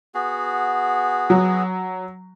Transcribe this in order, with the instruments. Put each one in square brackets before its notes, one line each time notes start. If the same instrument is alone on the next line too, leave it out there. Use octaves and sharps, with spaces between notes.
[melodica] B3 F#4 G#4
[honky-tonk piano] F#3